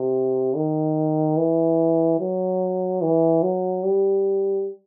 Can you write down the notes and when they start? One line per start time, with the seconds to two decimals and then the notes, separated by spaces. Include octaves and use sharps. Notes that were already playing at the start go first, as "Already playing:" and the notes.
Already playing: C3
0.56 D#3
1.37 E3
2.19 F#3
3.02 E3
3.43 F#3
3.84 G3